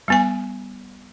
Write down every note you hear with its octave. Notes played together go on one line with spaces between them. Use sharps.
G3 B3 G#5